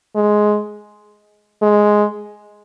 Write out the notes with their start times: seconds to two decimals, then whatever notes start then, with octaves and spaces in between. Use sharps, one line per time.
0.16 G#3
1.62 G#3